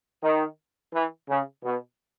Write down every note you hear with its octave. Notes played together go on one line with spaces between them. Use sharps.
D#3
E3
C#3
B2